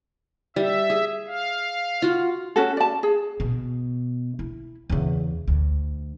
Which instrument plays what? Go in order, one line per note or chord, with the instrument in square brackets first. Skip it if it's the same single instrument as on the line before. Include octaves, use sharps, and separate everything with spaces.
[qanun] G3 [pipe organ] E5
[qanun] G#4
[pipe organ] F5
[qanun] F4 F#4
[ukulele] C#4 F#4 A4
D5 A5
G#4
[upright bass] B2
E4
E2 C#3
D2